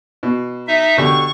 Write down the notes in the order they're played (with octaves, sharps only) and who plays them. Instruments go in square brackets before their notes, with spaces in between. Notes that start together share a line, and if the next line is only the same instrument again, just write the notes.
[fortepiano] B2
[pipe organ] D#4 E5
[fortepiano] B2 D3 G4 [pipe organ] C#6